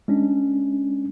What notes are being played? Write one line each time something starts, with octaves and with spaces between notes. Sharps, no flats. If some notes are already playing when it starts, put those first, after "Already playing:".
G#3 C#4 D4